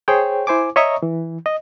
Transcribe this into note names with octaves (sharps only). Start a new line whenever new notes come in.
G#4 C5 C#5 G5
E4 C5 G#5 D6
C#5 D#5 E5 A#5 C#6 D#6
E3
D#5